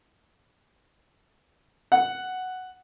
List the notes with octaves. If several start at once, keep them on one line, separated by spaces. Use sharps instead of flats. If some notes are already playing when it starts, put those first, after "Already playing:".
F#5